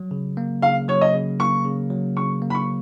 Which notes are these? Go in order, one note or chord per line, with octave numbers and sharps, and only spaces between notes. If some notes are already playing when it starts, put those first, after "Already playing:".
Already playing: F#3
C#3
A#3
C#3 F5
F#3 C#5
D#5
C#3
A#3 C#6
C#3
F#3
C#3 C#6
A#3
B5
C#6